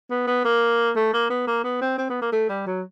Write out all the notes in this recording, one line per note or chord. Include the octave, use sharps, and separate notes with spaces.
B3
B3
A#3
A3
A#3
B3
A#3
B3
C4
C4
B3
A#3
A3
G3
F#3